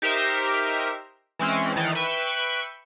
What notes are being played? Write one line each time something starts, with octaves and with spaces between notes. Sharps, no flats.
D#4 G4 A#4 C5 E5
E3 G#3 C4 C#4
D#3 E3 D#4 A6
B4 E5 G5 B5 C#6